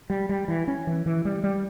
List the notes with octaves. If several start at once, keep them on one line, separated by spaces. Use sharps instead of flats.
G3
G3
E3
C#4
E3
E3
G3
G3